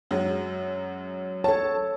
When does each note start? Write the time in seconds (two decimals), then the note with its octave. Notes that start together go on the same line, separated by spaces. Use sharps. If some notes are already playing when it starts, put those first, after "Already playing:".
0.11 F#2 F#3 G#3
1.44 A4 C#5 A5